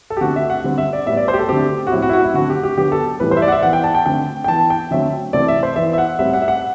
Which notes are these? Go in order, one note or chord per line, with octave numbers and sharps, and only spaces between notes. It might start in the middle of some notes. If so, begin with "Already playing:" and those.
A4
G4
D3 A3 C4 F#4
E5
F#5
D3 G3 C4
E5
D5
A2 G3 B3 E5
D5
C5
G4
A4
D3 A3 C4 G4
F#4
A2 F#3 C4 E4
F#4
E4
F#4
E4
D3 A3 C4 F#4
G4
G4
D3 F#3 B3 G4
A4
A2 E3 G3 B4
C5
E5
D5
F#5
E5
E3 B3 F#5
G5
A5
G5
D3 A3 C4 G5
G5
E3 B3 A5
G5
D3 F#3 A3 C4 E5
C3 E3 A3 C4 D5
E5
C5
E3 B3 E5
E5
F#5
A2 G3 C4 E5
F#5
E5
F#5